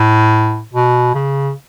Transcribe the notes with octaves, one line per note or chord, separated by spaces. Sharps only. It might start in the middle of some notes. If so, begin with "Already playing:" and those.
Already playing: A2
B2
C#3